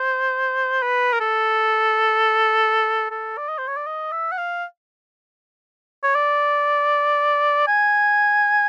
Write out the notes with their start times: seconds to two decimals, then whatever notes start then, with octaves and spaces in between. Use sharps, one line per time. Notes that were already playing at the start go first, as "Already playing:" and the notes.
Already playing: C5
0.82 B4
1.13 A#4
1.20 A4
3.11 A4
3.38 D5
3.49 D#5
3.58 C5
3.68 C#5
3.77 D5
3.87 D#5
4.12 E5
4.32 F#5
4.38 F5
6.03 C#5
6.16 D5
7.68 G#5